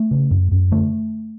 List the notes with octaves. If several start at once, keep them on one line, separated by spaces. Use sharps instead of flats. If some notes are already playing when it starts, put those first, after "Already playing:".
Already playing: A3
C#3
F#2
F#2
D3 A3